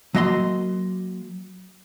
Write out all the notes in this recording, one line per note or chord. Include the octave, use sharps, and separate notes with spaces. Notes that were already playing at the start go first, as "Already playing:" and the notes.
F#3 A#3 D#5 A#5 C6